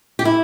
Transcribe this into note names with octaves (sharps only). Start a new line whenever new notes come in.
G4
E4